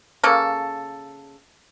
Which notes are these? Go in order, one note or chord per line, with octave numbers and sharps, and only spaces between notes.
C#3 A#3 A4